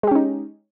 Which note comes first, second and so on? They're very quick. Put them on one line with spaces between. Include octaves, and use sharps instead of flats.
G#3 G4 C#4 D#4